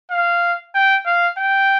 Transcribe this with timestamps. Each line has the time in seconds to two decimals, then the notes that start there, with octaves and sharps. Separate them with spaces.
0.11 F5
0.75 G5
1.06 F5
1.38 G5